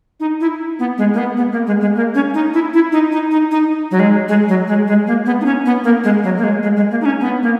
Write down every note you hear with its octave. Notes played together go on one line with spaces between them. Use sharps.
D#4
E4
B3
G#3
A#3
B3
B3
A#3
G#3
G#3
A#3
C#4
D#4
E4
E4
D#4
D#4
D#4
D#4
F#3
G#3
G#3
F#3
G#3
G#3
A#3
B3
D#4
C#4
B3
A#3
G#3
F#3
A#3
G#3
G#3
G#3
A#3
D#4
C#4
B3
A#3